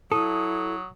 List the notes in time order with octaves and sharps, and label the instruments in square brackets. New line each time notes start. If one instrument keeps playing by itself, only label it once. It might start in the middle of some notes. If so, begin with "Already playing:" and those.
[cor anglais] F#3 [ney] E4 [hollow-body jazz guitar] A4 [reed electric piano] D#6